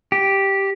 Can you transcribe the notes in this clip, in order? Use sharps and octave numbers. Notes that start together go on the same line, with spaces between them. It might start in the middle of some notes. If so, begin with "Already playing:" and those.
G4